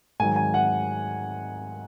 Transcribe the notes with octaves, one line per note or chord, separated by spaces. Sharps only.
G#2 D#3 F#3 G#5
G#5
F#5